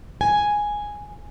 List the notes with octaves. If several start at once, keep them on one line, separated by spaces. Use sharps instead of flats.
G#5